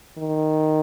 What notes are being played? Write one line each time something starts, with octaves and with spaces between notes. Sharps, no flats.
D#3